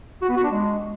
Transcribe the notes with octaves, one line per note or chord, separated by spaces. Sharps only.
F#4
B3
F#4
D4
G#3